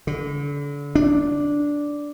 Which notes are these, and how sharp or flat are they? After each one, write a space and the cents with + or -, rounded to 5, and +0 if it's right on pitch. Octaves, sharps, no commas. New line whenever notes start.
D3 -35
D4 -5